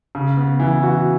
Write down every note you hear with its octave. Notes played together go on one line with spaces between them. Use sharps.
C#3
B3
E3
F#4